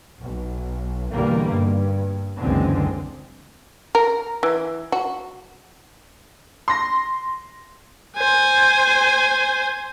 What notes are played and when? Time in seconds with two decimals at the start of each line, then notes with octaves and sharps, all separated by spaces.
0.20 B1
1.13 E2 B2 D3 D#3 G3 A#3
1.51 G2
2.40 F#1 C#2 D3 E3 G#3 C4
3.95 A#4
4.43 E3
4.92 F#4
6.68 C6 A#6
8.17 C5 G#5